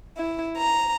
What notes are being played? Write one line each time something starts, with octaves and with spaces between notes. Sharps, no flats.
E4
A#5